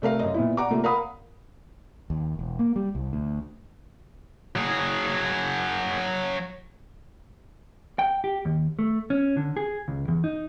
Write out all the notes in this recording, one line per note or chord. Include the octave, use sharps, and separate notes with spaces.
C3 A3 A#4 F5
F#2 D#5
A#2 B3 E4
D5 F#5 A#5 D6
C3 A3 A#3 F4
A#4 F5 F#5 B5 D#6
D#2
E1
A#3
G3
C2
D2
F#3 G#4
G5
G4
D#2
A3
C#4
D3
G#4
C#2
E2
D#4